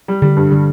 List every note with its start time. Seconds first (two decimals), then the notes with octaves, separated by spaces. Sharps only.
0.08 G3
0.22 D3 G3
0.37 G2
0.51 D3 G3